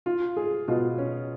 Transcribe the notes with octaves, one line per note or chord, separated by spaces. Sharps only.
F4
G#4
B2 F4
C#4